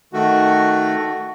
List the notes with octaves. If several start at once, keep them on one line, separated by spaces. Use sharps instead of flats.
D#3 A3 F#4